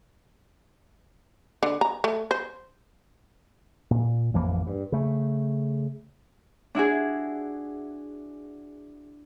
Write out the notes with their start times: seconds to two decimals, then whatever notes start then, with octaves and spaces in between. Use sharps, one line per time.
1.63 D3
1.81 A#5
2.04 A3
2.31 C5
3.91 A#2
4.34 A1 F2 E3 A#3
4.67 G2
4.92 C#3 A3
6.75 D4 E4 F#4 G#4